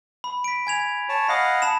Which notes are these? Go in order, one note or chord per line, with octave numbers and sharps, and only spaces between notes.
B5
B6 D7
G#5 G#6 F7
C#5 A5
D#5 F5 F#5 B5 D#6
A5 B5 E7